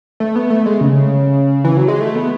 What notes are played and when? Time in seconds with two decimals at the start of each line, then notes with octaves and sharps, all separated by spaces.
0.20 A3
0.36 B3
0.50 A3
0.66 G#3
0.81 C#3
1.64 E3
1.77 F#3
1.88 G#3
2.01 A3
2.15 B3